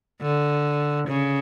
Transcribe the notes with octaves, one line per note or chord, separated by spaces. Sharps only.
D3
C#3